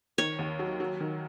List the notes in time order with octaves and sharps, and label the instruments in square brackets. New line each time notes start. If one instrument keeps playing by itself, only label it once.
[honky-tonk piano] D#3 [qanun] C#5
[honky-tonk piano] D#2
F#3
F#3
D#3